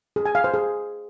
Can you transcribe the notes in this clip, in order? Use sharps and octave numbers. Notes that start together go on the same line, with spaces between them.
G#4
G#5
F5
C5
G#4